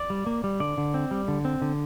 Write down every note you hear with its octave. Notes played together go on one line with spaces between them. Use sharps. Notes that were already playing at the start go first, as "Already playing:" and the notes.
Already playing: D5
G3
A#3
G3
D3 D5
D3
C4
G3
D3
C4
D3